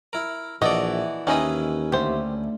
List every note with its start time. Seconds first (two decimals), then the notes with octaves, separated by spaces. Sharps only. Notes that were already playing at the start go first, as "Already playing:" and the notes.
0.13 E4 A#4
0.62 A#1 E3 F#4 A4 D5 D#5
1.27 D#2 D#3 C#4 E4 G#4 B4 D#5
1.92 D2 G4 C5